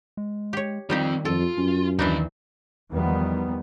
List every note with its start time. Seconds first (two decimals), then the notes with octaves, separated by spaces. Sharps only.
0.17 G#3
0.53 G4 C#5
0.90 D#3 G3 C4 D#4 F4 G4
1.25 F2 F4 A4
1.58 F#2 C#4
1.99 D#2 D#3 E3 D4 D#4 B5
2.90 E2 D#3 F3 G3 B3